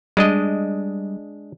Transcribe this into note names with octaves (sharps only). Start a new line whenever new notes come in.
G3 G#3 D4 D#5